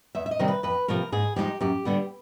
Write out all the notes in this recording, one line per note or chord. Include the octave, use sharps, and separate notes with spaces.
E2 E5
E5
D#5
C3 D#3 G3 C4
B4
F2 B4
C3 F3 A3 A#4
G#2 G#4
F3 G#3 B3 D#4 G4
F#2 G4
D3 G3 B3